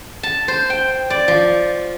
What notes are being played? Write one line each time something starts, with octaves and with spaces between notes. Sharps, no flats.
A5
C5
G5
D5
F3